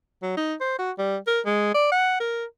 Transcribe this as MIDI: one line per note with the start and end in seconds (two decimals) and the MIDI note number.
0.22 0.36 54
0.37 0.54 63
0.61 0.78 72
0.79 0.91 66
0.98 1.17 55
1.27 1.41 70
1.46 1.72 56
1.75 1.91 74
1.92 2.18 78
2.20 2.45 70